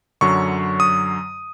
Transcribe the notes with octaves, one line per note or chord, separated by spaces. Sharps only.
F#2 D3 F#3 C#6
D#6